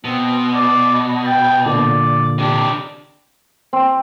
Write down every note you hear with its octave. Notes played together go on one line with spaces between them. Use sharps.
B2 C4
D5
G5 A6
A#2 D3 D5
C3 D4 G4
C4